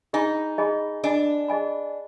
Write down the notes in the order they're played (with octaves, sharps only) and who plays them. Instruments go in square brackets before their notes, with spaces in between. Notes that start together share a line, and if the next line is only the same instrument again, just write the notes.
[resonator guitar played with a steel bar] D#4 [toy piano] G#4 D#5 G#5 B5
[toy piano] G#4 D#5 G#5 B5
[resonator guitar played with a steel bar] D4 [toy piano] G#4 D#5 G#5 B5
[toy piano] G#4 D#5 G#5 B5